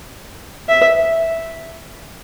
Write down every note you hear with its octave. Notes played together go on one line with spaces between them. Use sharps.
E5